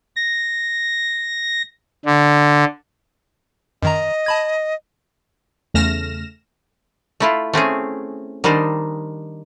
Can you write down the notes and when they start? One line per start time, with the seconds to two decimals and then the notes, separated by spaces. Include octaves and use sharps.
0.16 A#6
2.06 D3
3.83 F#2 D#3 D#5 A#5
4.26 A5 B5 G#6
5.74 E2 C#3 A3 F6 A#6 E7
7.20 A3 E4 F4
7.53 A3 C4 C#4 G#4
8.44 D#3 G3 D4 D#4 C5